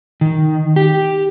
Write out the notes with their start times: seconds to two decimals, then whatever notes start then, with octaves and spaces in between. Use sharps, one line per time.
0.21 D#3
0.76 G4